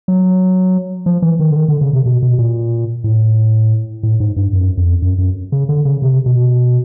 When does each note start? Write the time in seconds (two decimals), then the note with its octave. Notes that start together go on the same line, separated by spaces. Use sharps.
0.08 F#3
1.06 F3
1.22 E3
1.39 D#3
1.51 D3
1.56 D#3
1.68 D3
1.81 C#3
1.93 C3
2.06 B2
2.22 B2
2.38 A#2
3.04 A2
4.03 A2
4.20 G#2
4.36 G2
4.53 F#2
4.77 F2
5.02 F#2
5.18 F#2
5.52 C#3
5.69 D3
5.85 C#3
6.02 C3
6.26 B2